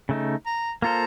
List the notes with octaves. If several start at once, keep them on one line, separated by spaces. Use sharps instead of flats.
C#3 A3 D#4
A#5
A#3 F4 A4 C5 A#5